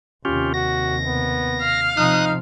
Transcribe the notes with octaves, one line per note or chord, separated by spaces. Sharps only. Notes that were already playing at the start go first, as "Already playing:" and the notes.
D#2 C3 C#4 F4 G4
F#4 A#6
B3
F5
C3 F3 D#4 D#6 F#6